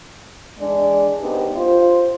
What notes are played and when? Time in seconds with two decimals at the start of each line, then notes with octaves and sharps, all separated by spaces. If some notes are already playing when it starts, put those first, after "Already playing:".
0.59 E2 G#3 D4 D5
1.19 D#2 B3 C4 D4 D#4 G4
1.56 F4 C5